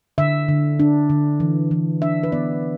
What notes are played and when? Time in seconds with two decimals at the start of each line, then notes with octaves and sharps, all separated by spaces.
0.18 D3 E5
0.48 D3
0.80 D4
1.10 D3
1.40 E3
1.71 E3
2.02 D4 E5
2.23 B4
2.32 B3 D5